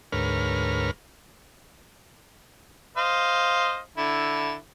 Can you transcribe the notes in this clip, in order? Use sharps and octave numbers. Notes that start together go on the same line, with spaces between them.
D2 G#2 A#4 B4 C#5 F6
C5 D#5 F5
D3 E4